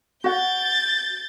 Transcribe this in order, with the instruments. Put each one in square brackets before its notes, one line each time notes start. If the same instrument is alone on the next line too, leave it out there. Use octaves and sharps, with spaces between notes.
[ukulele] F#4 F#5 [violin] G6 A6